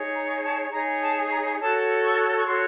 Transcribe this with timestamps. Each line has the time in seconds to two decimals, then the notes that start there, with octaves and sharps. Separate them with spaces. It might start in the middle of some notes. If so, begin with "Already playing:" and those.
Already playing: D#4 G#4 C#5
0.14 A#5
0.44 A5
0.72 D#4 G#4 C#5 A#5
1.01 A5
1.30 A#5
1.59 F#4 A4 C#5 A5
2.03 C#6
2.37 C#6
2.46 F#4 A4 C#5 C6